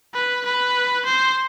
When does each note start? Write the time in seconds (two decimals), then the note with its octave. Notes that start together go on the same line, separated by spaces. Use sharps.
0.14 B4
0.45 B4
1.06 C5